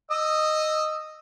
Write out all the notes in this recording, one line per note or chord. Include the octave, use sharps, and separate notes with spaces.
D#5 D#6 E6